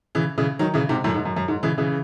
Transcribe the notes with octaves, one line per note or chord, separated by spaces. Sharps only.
C#3 E3
C#3 E3
D#3 F#3
C#3 E3
G#2 C3
F#2 A2
G#2
F#2
F#2
G#2
C#3 E3
C#3 E3